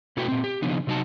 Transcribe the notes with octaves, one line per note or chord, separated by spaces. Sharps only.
B2 A3 E4 F#4 B4 G5
A#2 C4
G4
C#3 F3 B3 D4 D#4
C3 F#3 D#4 F#4 A5